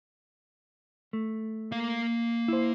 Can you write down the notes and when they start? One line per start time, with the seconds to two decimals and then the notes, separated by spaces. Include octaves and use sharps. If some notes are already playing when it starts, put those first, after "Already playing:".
1.13 A3
1.72 A#3 F5
2.48 E4 C5